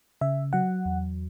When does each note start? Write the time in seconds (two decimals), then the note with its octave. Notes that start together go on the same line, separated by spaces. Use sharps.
0.21 C#3 E5
0.53 F#3 F#5
0.85 E2